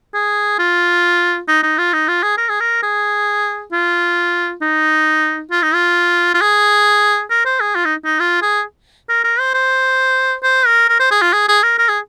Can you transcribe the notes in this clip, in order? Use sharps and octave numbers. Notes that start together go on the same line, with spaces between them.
G#4
F4
D#4
D#4
F4
D#4
F4
G#4
A#4
G#4
A#4
G#4
F4
D#4
F4
D#4
F4
F4
G#4
A#4
C5
G#4
F4
D#4
D#4
F4
G#4
A#4
A#4
C5
C5
C5
A#4
A#4
C5
G#4
F4
G#4
G#4
A#4
A#4
G#4